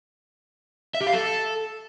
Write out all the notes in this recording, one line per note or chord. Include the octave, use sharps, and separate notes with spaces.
E5
G4
F5
A4